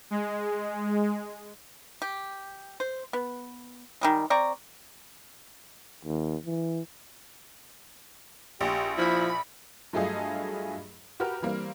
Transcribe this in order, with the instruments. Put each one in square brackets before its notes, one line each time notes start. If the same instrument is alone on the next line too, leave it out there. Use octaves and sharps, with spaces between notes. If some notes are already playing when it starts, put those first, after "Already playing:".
[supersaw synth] G#3
[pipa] G4
C5
B3
D#3 G3 G#3
C4 D5 A#5 C#6
[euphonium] D#2
E3
[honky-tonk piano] A#1 [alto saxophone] G4
[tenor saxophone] F3 [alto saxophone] E4 [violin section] B5
[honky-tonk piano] G2 F#3 A3 F4 G#4 D#5
F#4 G4 A#4 B4 F6
E3 G3 A#3 C4